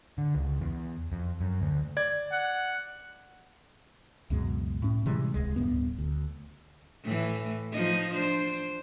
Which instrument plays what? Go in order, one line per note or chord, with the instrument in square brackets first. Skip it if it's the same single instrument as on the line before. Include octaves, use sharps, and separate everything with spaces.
[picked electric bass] D3
C#2
E2
F2
F#2
D2
[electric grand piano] D5 G#6
[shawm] F#5
[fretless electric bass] C#2 F#2 B2 G#3
A2 C#4
C3 E3 G3 G#3
D#1 C#2 G#3
D1 G2 B3
D2
[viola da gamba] A2 E3
F3 D#4 D#5
D4 C5